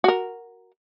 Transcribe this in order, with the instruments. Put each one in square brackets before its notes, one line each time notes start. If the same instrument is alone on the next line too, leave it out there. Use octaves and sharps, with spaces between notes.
[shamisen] F#4 A#4